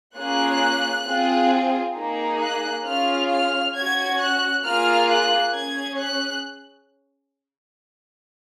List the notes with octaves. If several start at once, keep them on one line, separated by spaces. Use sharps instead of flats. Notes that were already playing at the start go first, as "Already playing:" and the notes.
A#3 C#4 F4 G#4 F#6
C4 F4 G#4
A#3 D#4 G#4
F#6
C#4 F4 G#4 F6
F6
C#4 F#4 G#6
F#6
A#3 F4 G#4 F6
F#6
C#4 G#4 G#6
F#6